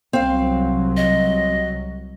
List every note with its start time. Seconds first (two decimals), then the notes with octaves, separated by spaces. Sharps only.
0.13 C2 F#3 C4 F5
0.97 D#5